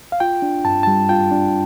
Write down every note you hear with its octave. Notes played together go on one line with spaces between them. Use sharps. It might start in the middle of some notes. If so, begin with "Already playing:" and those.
F5
F4 G5
D4
G2 A5
G3 A5
F4 G5
D4